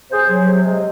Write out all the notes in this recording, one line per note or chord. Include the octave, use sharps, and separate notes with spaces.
C3 G#4 C5
F#3
C3
G#3